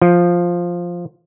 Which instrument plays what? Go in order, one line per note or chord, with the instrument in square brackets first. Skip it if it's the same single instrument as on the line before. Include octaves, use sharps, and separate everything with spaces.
[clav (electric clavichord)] F3